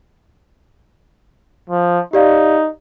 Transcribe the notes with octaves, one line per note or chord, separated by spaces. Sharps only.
F3
D#4 G4 D5 F5